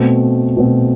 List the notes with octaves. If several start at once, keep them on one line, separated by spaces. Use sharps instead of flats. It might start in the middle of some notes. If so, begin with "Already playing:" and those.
Already playing: B2 A3 C4
B2 A3 C4